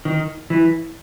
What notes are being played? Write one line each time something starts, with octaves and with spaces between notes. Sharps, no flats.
D#3
E3